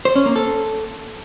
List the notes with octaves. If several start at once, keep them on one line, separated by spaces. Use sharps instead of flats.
C5
C#4
A#3
A4